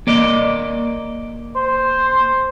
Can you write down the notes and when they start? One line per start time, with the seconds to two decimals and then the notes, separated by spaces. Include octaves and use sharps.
0.07 A#3 D5 D#5
1.56 C5